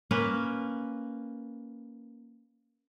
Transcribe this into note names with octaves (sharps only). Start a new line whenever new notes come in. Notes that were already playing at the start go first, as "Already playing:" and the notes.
A#3 C#4 B4